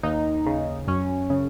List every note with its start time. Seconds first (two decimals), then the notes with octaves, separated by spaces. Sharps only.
0.03 D#2 D#4
0.46 C#3
0.87 F#2 C#4
1.30 C#3